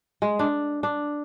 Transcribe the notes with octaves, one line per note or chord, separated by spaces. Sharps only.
G#3
D4
D4